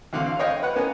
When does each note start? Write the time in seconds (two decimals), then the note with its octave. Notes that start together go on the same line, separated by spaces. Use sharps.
0.13 D2 D3 C4 F5
0.27 F5
0.39 C#5 D#5 F5 G5
0.63 B4 F#5
0.76 A#3 B3 C#4